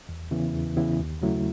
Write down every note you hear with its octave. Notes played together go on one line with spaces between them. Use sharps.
E2
C#3 E3 B3 E4
E2
C#3 E3 B3 E4
D#2
C#3 F#3 A3 E4